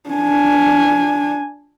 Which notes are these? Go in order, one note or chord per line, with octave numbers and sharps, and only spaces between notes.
D4 G#5